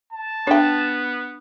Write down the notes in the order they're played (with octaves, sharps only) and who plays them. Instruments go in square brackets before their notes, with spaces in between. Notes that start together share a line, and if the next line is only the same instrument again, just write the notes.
[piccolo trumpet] A5
[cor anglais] B3 [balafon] D4 [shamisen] C#5 G5